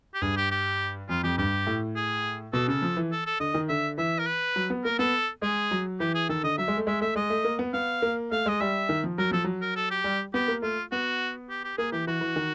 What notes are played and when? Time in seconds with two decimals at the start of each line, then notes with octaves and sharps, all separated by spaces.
0.14 G4
0.22 G2 G#4
0.37 G4
0.51 G4
1.09 F2 F4
1.23 F2 G4
1.38 G2 G4
1.67 A2
1.96 G#4
2.53 B2 A4
2.68 C#3 A4
2.82 F3
2.97 E3
3.12 A4
3.26 A4
3.40 D3 D#5
3.54 D#3
3.69 D3 E5
3.98 E3 E5
4.19 A#4
4.27 B4
4.56 F#3
4.70 B3
4.84 A#3 A#4
4.99 B3 A4
5.42 G#3 G#4
5.71 F#3
6.00 E3 G4
6.15 G#4
6.29 D#3 A4
6.43 D3 D#5
6.58 F#3 E5
6.68 G#3
6.77 A3
6.87 G#3 E5
7.01 A3 E5
7.16 G#3 D#5
7.30 A3
7.44 A#3
7.59 B3
7.73 B3 F5
8.02 A#3
8.31 A3 F5
8.46 G#3 D#5
8.60 G3 E5
8.89 D#3
9.04 F3
9.18 F#3 A#4
9.31 F3 A4
9.44 F#3
9.61 A#4
9.76 A4
9.91 G4
10.04 G3
10.34 B3 G4
10.48 A#3
10.62 A3 F4
10.92 B3 F#4
11.49 G4
11.64 G4
11.78 A#3 G#4
11.92 E3 G4
12.07 E3 F#4
12.21 E3
12.36 D#3